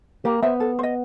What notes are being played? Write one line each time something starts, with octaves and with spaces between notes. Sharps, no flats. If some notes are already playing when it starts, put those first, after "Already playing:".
A#3 G4
B3 C5 E5
A4
C5
D#5